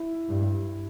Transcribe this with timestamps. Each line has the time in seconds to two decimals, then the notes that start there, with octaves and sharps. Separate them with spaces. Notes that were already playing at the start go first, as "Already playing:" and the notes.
Already playing: E4
0.29 G2